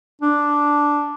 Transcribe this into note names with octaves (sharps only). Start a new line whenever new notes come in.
D4